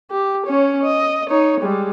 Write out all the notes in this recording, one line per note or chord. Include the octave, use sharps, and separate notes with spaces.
G4
C#4 C#5
D#5
D#4 C#5
G3 G#3